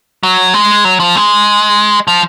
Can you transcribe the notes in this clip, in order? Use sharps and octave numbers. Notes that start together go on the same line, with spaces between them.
F#3
G#3
F#3
F3
G#3
F3